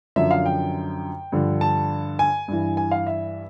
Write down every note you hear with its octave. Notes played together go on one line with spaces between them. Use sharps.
F#2 D3 F3 E5
F5
G5
G2 D3 F3
A5
G#5
G2 E3
G#5
F5
E5